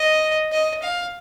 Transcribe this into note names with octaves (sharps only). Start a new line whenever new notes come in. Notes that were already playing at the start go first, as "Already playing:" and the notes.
Already playing: D#5
D#5
F5